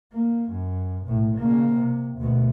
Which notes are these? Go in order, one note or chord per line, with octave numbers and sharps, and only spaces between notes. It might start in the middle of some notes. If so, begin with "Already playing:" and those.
A#3
F#2
B1 A2
C#3 A#3
C3
D2 B2